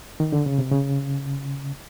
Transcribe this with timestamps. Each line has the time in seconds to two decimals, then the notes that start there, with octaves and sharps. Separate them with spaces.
0.20 D#3
0.33 D3
0.46 C#3
0.59 C3
0.72 C#3